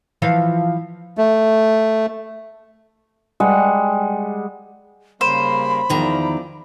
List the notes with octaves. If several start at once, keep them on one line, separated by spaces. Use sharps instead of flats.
E3 F3 F5
A3
G3 G#3 F#5
C#3 G3 A#3 C5 B5
E2 D#3 F3 E4 D5 A#5